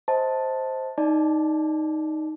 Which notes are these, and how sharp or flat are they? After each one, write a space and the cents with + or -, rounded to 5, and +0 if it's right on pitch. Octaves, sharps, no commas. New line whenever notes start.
C5 +0 D#5 +30 A5 +0
D#4 +0 D5 +0 A5 +0